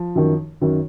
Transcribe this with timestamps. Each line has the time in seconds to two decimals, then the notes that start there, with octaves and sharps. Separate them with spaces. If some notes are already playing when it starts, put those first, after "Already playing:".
Already playing: F3
0.15 F#2 D#3
0.61 F#2 D#3